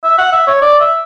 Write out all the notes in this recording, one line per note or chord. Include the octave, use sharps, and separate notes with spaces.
E5
F#5
E5
C#5
D5
E5